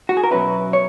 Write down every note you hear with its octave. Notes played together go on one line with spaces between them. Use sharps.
F#4
G#4
A#4
B2 F#3 C#4 E4 B4
C#5